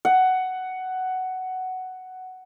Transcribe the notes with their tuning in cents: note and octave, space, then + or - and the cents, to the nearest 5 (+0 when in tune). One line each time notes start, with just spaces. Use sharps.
F#5 +10